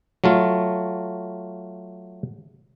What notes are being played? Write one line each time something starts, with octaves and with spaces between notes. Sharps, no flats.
F#3 A3 F4